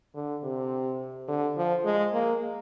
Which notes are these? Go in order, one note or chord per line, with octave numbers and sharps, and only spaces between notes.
D3
C3
D3
F3
G#3
A#3